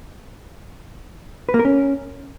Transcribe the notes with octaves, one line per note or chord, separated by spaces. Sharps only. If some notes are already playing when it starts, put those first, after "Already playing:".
B4
A#3
A#4
C#4